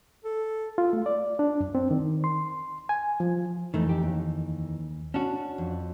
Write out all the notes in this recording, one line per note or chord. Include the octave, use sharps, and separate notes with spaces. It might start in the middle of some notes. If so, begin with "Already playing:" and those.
A4
F4
A3
D5
D4
F#2
C4
D#3
C6
G#5
F3
F2 D#3 E3 A3 D#4
G4
D#2
C#4 D4 F#4 A5
F2